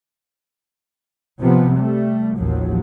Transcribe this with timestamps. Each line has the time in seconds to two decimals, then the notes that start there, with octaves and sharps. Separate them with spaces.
1.41 C3 F3 B3
1.78 G3 A3
2.38 A1 D#2 F3 F#3